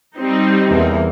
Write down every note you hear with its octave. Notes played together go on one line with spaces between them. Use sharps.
G3 C4 D#4
E2 E3 A#3